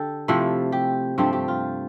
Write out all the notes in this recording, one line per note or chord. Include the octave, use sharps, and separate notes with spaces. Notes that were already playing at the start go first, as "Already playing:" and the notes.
Already playing: D3 G4 A4
C3 F3 A3 E4
G4
G2 F3 A3 C4 G4
G4
F4